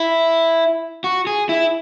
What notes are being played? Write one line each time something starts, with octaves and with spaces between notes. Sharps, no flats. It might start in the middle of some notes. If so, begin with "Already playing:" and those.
Already playing: E4
F#4
G#4
E4